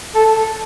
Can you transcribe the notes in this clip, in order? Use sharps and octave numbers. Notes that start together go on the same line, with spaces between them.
A4